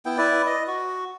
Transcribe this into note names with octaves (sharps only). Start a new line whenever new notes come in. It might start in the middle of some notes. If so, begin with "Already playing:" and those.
B3 E4 G5
E4 B4 D5
D#5
F#4